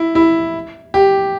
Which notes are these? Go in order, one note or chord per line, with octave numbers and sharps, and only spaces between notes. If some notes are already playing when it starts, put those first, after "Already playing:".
Already playing: E4
E4
G4